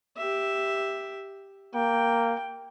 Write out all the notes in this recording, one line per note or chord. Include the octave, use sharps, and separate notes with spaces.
G4 E5
A#3 G5